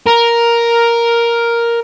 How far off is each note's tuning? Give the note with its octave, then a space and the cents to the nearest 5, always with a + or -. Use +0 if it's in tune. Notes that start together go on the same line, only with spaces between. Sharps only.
A#4 +5